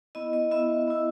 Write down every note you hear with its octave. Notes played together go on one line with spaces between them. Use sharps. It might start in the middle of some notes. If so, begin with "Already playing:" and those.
B3 E4 D#5
D#5
B3 E4 E5
B3 E4